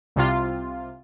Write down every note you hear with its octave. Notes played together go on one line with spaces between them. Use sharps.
C2 C3 F4